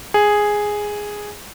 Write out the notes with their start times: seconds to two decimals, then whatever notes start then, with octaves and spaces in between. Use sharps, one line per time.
0.14 G#4